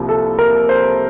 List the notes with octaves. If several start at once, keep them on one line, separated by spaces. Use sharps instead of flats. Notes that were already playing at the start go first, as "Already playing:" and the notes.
Already playing: C2 C3 F3 A#3
A4
A#4
C5